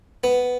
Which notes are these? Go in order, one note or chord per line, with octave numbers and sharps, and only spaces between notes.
B3